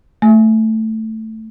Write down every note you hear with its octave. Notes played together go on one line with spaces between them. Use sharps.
A3